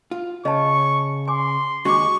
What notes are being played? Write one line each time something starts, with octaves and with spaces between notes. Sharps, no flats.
F4
C#3 D#5 A5 C#6
G#5 C6 D6
D#2 G#3 D4 F#4 C#6 D6